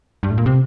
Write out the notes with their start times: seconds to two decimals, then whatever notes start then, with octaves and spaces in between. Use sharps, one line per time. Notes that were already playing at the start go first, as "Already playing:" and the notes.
0.23 G2
0.31 A2
0.38 A#2
0.46 C3